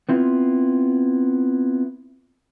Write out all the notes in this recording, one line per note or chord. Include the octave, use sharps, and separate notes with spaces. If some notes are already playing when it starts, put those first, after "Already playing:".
B3 C4 E4 F4